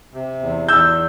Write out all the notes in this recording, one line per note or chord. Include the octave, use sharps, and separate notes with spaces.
C3
E2
E2 E6 G6